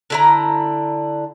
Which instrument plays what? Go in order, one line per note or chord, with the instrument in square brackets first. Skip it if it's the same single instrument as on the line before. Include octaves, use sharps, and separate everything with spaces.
[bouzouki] D3 E4 A#5